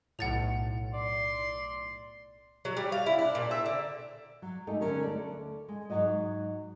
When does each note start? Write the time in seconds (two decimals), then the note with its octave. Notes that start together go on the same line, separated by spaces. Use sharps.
0.19 B1 A2 F#5 A6 F7
0.94 D5 C6
2.65 F#3
2.77 G3
2.92 F5
3.06 E4
3.19 D4
3.35 A#2
3.51 E5
3.66 D3
4.42 F#3
4.67 G#3 A3 D#4 G4 A4
4.81 D3 F#3 G3 B3 C#4 A#4
5.03 D2 A4 D5
5.69 G#3
5.90 G#2 D#3 F#3 F#4 D#5